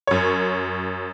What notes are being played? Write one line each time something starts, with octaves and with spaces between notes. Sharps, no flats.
F#2 C#5